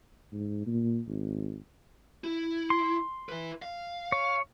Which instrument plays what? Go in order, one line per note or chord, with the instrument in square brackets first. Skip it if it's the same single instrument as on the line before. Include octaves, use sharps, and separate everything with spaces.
[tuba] G#2
A#2
G#1
[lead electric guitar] E4
[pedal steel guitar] C6
[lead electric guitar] E4 B4
F5
[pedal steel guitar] C#5